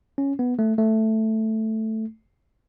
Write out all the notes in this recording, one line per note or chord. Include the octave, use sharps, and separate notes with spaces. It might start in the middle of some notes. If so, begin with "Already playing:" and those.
C#4
B3
A3
A3